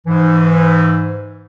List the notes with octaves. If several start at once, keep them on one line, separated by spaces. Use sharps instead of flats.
G#2 E3